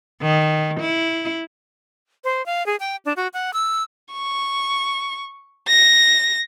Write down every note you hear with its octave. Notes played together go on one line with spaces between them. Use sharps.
D#3
E4
C5
F5
G#4
G5
D4
F#4
F#5
E6
C#6
A#6